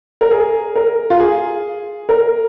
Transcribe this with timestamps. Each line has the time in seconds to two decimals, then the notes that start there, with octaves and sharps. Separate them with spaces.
0.21 A#4
0.31 G#4
0.75 A#4
1.10 F4
1.20 G#4
2.09 A#4